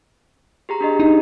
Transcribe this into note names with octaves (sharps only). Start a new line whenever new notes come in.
G4 G#4 A#5
D4 G4 D#5
D#4